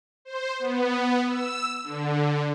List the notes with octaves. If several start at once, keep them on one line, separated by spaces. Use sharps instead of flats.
C5
B3
E6
D3